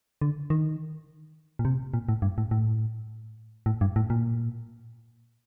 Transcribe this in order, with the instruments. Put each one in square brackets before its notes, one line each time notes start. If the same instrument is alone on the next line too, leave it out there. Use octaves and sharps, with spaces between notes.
[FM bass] D3
D#3
A#2
C3
A#2
A2
G2
A2
A2
A2
G2
A2
A#2